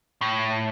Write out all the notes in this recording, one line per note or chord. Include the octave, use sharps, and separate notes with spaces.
A2